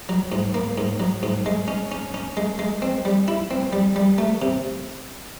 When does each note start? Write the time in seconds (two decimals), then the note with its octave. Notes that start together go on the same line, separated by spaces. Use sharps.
0.09 F#3
0.32 G#2
0.54 A#3
0.78 G#2
1.00 F#3
1.23 G#2
1.46 G#3
1.68 C#4
1.91 C#4
2.14 C#4
2.37 G#3
2.59 G#3
2.82 C4
3.05 G3
3.28 E4
3.51 C4
3.73 G3
3.96 G3
4.18 A3
4.42 C3